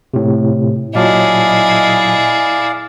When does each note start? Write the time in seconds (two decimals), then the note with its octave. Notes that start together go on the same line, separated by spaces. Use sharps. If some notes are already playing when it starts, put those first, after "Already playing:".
0.14 A2 C3
0.95 A#2 F#3 E4 G#4 D5 D#5 F5 A5